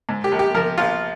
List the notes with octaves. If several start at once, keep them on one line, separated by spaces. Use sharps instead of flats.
G#2
G4
A#1
G4
F3 A#4
A#1 F4